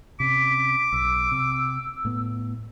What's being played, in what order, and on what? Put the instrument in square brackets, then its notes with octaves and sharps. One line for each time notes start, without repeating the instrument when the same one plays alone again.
[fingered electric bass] C3 C#4 [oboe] D6 [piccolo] B6
[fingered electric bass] B1 [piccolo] E6
[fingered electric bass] C3
A2 B3